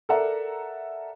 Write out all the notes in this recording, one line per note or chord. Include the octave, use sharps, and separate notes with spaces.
A4 A#4 D5 E5 F#5 A#5